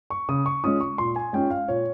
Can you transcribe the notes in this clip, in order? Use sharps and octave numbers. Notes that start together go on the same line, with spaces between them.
C#6
C#3 D#6
C#6
G#3 C#4 F4 D#6
C#6
A#2 C6
G#5
G#3 C#4 F4 G5
F5
A#2 C#5